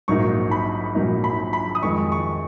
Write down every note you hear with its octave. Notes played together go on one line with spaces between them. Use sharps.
A#1 G#2 F#3 A#3 D#4 C#6
B5
A#1 G#2 F#3 A#3 D#4
B5
B5
D#6
F2 D#3 G#3 C#6
C#6